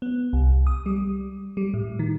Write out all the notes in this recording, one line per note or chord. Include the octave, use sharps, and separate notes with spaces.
B3
C2
D#6
G3
G3
A2
D#3